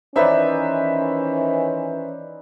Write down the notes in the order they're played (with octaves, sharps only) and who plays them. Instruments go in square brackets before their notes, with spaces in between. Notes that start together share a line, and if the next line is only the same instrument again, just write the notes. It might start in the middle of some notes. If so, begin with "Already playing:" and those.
[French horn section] D#3 E3 C#4 [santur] D#4 B4 D5 [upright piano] C5 E5